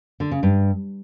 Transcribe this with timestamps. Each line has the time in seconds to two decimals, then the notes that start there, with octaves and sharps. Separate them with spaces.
0.20 D3
0.31 C#3
0.43 G2